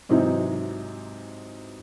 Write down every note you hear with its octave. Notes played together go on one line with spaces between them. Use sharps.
G#2 C3 E3 F#3 C4 D#4